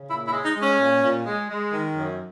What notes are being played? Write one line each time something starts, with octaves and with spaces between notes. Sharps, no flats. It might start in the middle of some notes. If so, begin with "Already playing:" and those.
Already playing: C#3
A#2 E4
E4
G#3
D#4
G#3
C#4
A#2
A#2
G#3
G#3
D#3
F#2